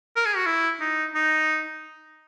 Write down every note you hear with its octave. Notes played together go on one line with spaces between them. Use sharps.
A#4
G#4
F#4
E4
D#4
D#4